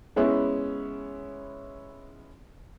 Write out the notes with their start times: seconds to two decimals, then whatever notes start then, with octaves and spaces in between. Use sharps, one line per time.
0.16 G#3 B3 C#4 E4